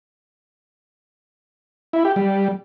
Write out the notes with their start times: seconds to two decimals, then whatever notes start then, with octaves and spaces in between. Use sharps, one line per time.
1.93 E4
2.05 G4
2.16 G3